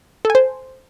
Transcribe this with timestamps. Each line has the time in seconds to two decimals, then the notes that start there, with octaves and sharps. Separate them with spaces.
0.25 A4
0.30 G#5
0.35 C5